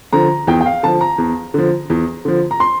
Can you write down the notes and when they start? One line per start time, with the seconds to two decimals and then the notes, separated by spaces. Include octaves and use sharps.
0.13 D3 F3 A#5
0.47 E2 G5
0.61 G5
0.66 F5
0.83 D3 F3 A5
1.01 A#5
1.18 E2
1.54 D3 F3
1.90 E2
2.25 D3 F3
2.51 A#5
2.60 C6